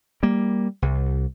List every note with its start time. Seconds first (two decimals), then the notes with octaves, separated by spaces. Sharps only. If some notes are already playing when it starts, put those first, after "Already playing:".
0.23 G3 A#3
0.82 C2